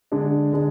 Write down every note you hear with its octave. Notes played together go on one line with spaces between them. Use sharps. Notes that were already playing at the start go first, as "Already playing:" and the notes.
D3 G#3 D4
D3 G#3 D4